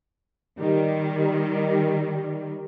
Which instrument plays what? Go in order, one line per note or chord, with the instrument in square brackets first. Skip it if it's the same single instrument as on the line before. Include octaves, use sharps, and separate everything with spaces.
[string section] D#3 G3